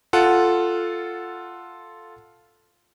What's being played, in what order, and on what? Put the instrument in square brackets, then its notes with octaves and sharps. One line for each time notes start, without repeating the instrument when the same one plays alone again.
[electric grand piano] F4 A4 F#5